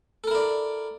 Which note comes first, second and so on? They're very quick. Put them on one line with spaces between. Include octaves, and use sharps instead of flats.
A4 A#4 E4 D5